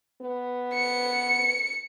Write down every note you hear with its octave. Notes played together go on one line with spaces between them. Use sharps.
B3
C#7